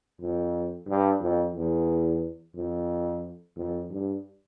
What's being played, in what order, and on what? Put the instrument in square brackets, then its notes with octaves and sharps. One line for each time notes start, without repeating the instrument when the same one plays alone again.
[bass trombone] F2
G2
F2
E2
F2
F2
G2